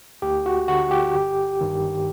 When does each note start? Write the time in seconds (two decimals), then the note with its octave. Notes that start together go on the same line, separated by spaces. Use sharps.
0.22 D2 G4
0.46 F#4
0.68 D3 F#4
0.91 G4
1.15 G1
1.61 G2 D#3